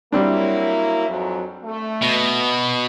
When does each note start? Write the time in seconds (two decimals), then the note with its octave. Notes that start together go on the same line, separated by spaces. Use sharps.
0.12 F#3 G3 A#3 C4 D4 E4
1.08 F2 G#2 F#3
1.64 A3
2.02 B2